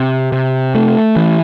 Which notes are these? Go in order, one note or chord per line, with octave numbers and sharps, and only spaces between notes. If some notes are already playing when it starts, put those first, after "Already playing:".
Already playing: C3
C3
A3
E3